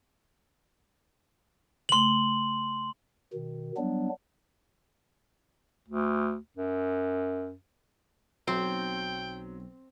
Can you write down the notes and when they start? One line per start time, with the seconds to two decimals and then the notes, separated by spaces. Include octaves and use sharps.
1.89 C#3 A3 C6 F#7
3.33 B2 D#3
3.77 F#3 G3 B3 D4
5.89 D2
6.57 F#2
8.47 B1 F#3 C4 G5